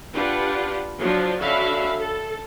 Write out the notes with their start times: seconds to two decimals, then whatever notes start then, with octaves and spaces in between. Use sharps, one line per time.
0.13 D4 F4 G4 B4 F#5
1.00 F3 F#3 D4 F4
1.41 D3 C#4 F#4 E5 F5 B5
1.99 A4